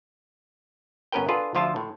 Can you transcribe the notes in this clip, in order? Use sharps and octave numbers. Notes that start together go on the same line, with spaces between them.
G1 B3 C#4 A#4 B4 G5
D4 F4 G#4 A4 B4
D2 F3 F4 E5 A5
A2